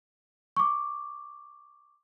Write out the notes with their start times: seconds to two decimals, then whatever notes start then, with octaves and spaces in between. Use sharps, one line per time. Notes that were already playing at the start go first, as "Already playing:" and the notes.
0.57 C#6 D6